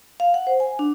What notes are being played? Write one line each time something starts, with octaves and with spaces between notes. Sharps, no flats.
F5
F#5
C5
G#5
D4